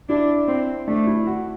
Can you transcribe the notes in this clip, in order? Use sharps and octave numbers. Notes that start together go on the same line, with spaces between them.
D4 E4
C4
A3 D4
E4
F#4